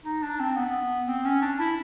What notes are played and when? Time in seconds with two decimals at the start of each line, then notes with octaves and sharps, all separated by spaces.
0.05 D#4
0.22 D4
0.40 C4
0.57 B3
1.08 C4
1.25 C#4
1.42 D4
1.60 E4